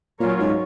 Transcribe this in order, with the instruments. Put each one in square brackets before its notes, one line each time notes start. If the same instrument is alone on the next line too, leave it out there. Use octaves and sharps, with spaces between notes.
[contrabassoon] A#2 [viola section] F#3 C#4 F4 A#4 C#5
[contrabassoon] G#2